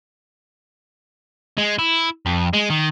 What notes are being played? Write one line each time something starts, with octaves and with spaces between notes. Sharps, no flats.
G#3
E4
F2
G#3
D#3